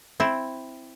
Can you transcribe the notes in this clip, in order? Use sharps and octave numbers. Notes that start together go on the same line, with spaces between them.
C4 E4